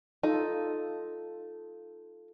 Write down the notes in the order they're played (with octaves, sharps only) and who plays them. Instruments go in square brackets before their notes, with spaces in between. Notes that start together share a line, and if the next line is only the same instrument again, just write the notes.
[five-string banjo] D#4 [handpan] F4 A4